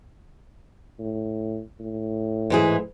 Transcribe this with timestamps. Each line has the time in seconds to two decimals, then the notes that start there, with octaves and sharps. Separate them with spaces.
0.99 A2
1.79 A2
2.50 G#2 E3 G#4